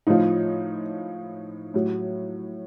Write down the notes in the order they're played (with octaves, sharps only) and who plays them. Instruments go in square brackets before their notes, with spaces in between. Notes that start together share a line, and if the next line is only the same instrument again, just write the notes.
[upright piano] A2 F3 D#4
A2 F#3